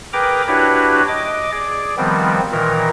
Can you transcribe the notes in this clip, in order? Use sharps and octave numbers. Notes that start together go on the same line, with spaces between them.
G#4 A#4 B4 G5 A#5 D6
D4 E4 F#4 G4 B4 C#5
D#5 D6
G#4 D5
D#3 F3 G3 B3 C4
A#2 D#3 E3 A#4